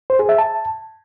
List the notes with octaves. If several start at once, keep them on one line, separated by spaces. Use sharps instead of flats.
C5
G#4
E5
A5